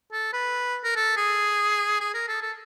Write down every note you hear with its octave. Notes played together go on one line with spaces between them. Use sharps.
A4
B4
A#4
A4
G#4
G#4
A#4
A4
A4